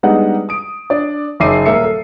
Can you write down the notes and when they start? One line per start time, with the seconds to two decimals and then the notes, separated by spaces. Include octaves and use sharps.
0.03 G3 G#3 B3 D4 D#4 F#5
0.49 D#6 D7
0.90 D4 D5
1.40 F#1 D#4 E5 D6 C7 D#7
1.65 D#1 A#3 E5 C#7
1.84 A4